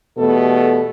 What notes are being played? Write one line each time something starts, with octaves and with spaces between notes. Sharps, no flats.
E2 B2 A3 B3 G4 A4